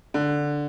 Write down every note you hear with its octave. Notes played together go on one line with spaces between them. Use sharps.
D3